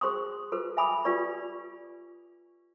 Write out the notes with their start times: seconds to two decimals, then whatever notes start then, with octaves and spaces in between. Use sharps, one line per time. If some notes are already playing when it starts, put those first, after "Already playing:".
0.01 G#4 C5 C6 C#6 D#6
0.52 F4 A4 B4 C5
0.77 E5 G#5 B5 D6 D#6
1.05 F4 G4 B4 D5 C#6